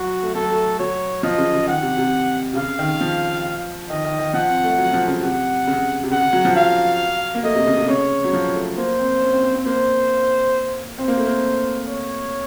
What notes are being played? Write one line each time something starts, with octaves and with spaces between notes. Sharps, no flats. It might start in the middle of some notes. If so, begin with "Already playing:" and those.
Already playing: F#3 F#4
A3
F#3 A4
A3
F#3 C#5
F3 D#5
C#3
C#3
D#3 F#5
C3
C3
C3
C#3 F5
D#3
F3
D#3 D#5
D#3
D#3
F3 F#5
C4
A3
F#3
F3
C#3
C3 F#5
C#3
C3
C#3 F#5
C#3
F#3
F3
F#3 F5
A#3
A3 D#5
C3
C#3
C3
C#3 C#5
F#3
F3
A3
A#3 C5
C4
C#4
C4
C4
C4
A#3 C5
C4 C5
A#3
A3
A#3
C#5